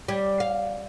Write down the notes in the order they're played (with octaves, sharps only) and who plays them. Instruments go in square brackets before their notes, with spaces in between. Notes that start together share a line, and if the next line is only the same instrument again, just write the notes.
[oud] G3
F5